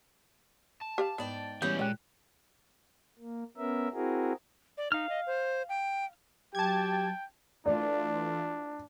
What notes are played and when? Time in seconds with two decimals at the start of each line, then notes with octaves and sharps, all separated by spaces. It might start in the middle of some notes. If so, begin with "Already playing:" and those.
0.81 A5
0.98 G4 D5 F5
1.18 G#2 B3 D5 G5
1.62 E3 G3 G#3 B3 C#4 G6
1.79 A#2 G#3 D5 G5 F#6
3.19 A#3
3.57 B3 C#4 A#4 E5
3.94 C4 E4 F#4 G#4 A#4
4.78 D5
4.92 D#4 F5 F6
5.09 D#5
5.27 C5
5.69 G5
6.55 F#3 G4 G5 A5 G#6
7.66 E3 A3 D4 F4 D5